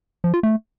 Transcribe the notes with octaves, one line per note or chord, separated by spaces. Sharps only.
F3
F4
A3